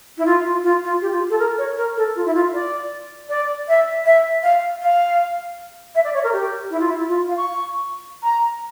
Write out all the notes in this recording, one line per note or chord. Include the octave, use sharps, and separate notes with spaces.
E4
F4
F4
F4
F4
G4
F4
A4
A#4
C#5
A#4
A4
F4
E4
F4
D5
D5
E5
E5
F5
F5
E5
D5
C#5
A#4
G4
E4
F4
E4
F4
F5
C#6
A#5